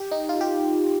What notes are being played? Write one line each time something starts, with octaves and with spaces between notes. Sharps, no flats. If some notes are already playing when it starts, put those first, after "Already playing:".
Already playing: G4
D#4
F4
G4